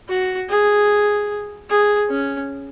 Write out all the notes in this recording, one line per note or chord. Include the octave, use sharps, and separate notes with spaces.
F#4
G#4
G#4
C#4